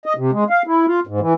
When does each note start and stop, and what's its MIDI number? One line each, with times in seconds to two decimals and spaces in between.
0.06 0.13 75
0.17 0.31 48
0.32 0.44 56
0.50 0.62 77
0.67 0.86 64
0.87 1.00 65
1.07 1.20 44
1.20 1.33 52